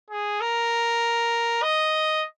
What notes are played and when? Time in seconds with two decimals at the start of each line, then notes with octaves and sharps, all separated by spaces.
0.10 G#4
0.40 A#4
1.62 D#5